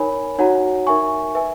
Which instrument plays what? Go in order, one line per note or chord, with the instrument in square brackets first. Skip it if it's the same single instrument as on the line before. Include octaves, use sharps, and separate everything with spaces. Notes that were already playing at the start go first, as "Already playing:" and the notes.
Already playing: [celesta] D#4 A#4 C#5 G#5 B5
D#4 F#4 C#5 F#5 A#5
D#4 A#4 E5 G#5 C#6
B4 E5 G#5